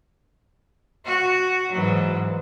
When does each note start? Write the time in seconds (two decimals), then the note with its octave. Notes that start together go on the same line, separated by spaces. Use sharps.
1.05 F#4
1.72 G#2 E3 F#3